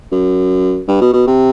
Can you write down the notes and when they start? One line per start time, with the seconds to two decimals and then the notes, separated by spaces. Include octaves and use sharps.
0.12 F#2
0.88 G2
1.01 B2
1.14 B2
1.27 C3